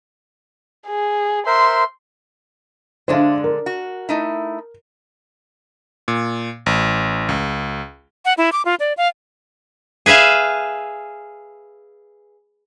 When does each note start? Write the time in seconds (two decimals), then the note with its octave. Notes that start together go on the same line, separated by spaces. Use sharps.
0.88 G#4
1.47 A#4 C5 E5 C6
3.08 D3 G#3 D4 C5 E5 F5
3.44 A#4
3.66 F#4
4.09 A3 D#4 E4
6.08 A#2
6.66 A1
7.29 C#2
8.25 F#5
8.38 E4
8.52 D6
8.65 F4
8.80 D5
8.97 F5
10.06 G#4 B4 E5 F5 G#5